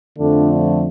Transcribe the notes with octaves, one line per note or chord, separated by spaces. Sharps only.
F2 D3 F3 A3 D4